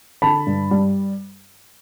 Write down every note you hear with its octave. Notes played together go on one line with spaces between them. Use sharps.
D3 A5 B5
G2
G3